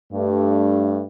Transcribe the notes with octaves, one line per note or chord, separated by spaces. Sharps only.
G2 A3